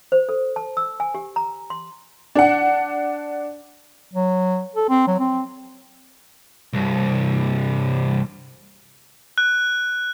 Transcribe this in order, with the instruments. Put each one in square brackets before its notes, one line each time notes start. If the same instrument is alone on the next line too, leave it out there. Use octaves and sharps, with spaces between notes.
[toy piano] C5
A4
A5
E6
G#5
G4
A#5
C6
[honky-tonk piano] D4 F#5
[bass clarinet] F#3
A4
C4
F#3
C4
[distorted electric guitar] C2 G2
[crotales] F#6